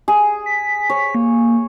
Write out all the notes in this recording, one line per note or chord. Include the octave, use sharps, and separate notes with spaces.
G#4
B6
C#5
A#3